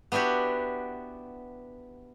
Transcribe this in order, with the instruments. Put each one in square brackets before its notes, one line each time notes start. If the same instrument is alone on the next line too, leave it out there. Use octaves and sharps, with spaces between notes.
[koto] B3 D4 E4 F#4 G4